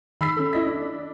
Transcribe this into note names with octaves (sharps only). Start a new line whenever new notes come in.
D#3 B5 E6 B6 C7
C#4 A4
E4 D#5 B6
D4